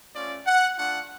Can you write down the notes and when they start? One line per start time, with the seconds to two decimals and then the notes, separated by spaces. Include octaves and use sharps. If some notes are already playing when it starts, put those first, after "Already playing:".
0.15 A3 C#4 F4 D5
0.46 F#5
0.78 A3 D4 F4 F#5